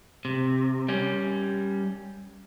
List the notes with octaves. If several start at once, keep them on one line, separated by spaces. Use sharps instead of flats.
C3
G3 C#4